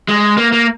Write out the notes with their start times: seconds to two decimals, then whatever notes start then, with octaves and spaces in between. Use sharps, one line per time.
0.08 G#3
0.37 A#3
0.52 A#3